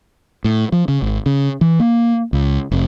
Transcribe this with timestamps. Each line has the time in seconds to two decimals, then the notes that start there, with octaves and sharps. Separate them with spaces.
0.44 A2
0.72 F3
0.88 C#3
1.02 G#1
1.26 C#3
1.61 E3
1.80 A#3
2.33 C#2
2.71 F1